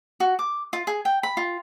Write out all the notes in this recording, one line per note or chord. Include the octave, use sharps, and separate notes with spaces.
F#4
D6
F4
G#4
G5
B5
F4